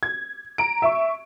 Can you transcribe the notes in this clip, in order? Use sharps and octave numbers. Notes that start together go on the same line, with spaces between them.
G#6
A#5 D7
E5 C#6